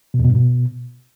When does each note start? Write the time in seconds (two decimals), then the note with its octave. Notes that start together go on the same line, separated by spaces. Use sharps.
0.14 B2
0.19 E2
0.25 B2
0.30 G2
0.35 B2